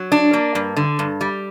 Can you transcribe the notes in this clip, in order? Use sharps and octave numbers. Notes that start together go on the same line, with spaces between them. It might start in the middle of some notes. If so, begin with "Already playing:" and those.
Already playing: F#3
D4
A#3
G2
D3
G2
G3